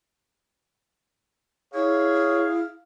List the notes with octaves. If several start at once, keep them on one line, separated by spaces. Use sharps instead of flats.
E4 G#4 C#5 F5